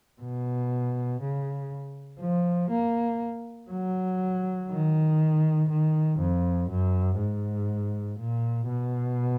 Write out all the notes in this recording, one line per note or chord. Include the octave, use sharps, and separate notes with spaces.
B2
C#3
F3
A#3
F#3
D#3
D#3
F2
F#2
G#2
A#2
B2